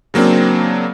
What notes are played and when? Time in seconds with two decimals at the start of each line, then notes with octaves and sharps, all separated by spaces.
0.14 C#3 F#3 A#3 C4 D4